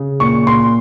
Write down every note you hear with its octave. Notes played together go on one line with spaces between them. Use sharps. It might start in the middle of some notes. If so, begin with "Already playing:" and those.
Already playing: C#3
A#2 C#6
A#2 C6